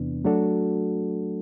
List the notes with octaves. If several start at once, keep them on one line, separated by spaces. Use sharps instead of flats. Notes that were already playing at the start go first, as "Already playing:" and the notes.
Already playing: E2 C3 E3 B3 D4
F#3 A3 D4 F#4 A4